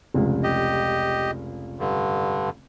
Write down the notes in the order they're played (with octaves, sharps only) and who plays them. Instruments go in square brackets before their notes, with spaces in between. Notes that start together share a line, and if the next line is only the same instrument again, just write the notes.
[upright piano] F1 C#2
[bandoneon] G4 D#5
G2 D3